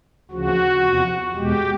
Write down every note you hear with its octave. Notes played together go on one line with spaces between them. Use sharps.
D2 C#3 F3 F#4
E2 C3 F3
E2 B2 G#3 G4